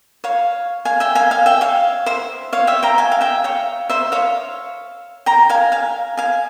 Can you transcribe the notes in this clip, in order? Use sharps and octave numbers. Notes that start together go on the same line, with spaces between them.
C#5 F5
F5 G#5
E5 G5
F5 G#5
F5 G#5
E5 G5
C#5 F5
C5 E5
C#5 F5
E5 G5
G5 A#5
F5 G#5
F5
E5 G5
C#5 F5
C5 E5
C#5 F5
G5 A#5
F5 G#5
F5 G#5
F5 G#5